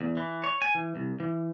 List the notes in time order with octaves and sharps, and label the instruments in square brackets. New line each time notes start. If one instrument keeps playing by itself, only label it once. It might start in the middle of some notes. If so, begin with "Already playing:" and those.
[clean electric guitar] E2
E3
C#5
G#5
E3
C2
E3